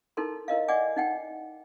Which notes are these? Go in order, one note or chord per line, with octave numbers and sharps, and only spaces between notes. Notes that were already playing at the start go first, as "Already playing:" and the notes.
D#4 E4 A4 A#4 C6
E4 A#4 D#5 F5
D5 D#5 F#5 G#5 D6
D#4 F#5 G5